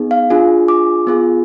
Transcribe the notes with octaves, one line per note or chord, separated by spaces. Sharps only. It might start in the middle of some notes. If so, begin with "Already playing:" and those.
Already playing: B3 D#4 G#4
F5
D4 F4 G#4
D6
B3 F4 G#4